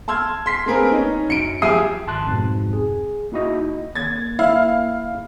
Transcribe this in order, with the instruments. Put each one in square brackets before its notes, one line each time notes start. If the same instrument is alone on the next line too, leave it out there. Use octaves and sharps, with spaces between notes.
[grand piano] A5 C6 E6 F6 G#6
C6 B6 C7
A3 A#3 C4 G#4 A#4 B4
C#4 D#4
F#2 C#7 D7
F3 G4 G#4 E5 D#6 C7
[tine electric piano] G#1 A5 C6 F#6
F2 G#2 B2
G#4
A#3 D#4 E4 F#4 D#5
[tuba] A#3 [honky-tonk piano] G#6 A6
[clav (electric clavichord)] E4 [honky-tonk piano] F5